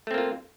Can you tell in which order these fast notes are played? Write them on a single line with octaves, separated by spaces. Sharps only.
A3 C4 A#3 F4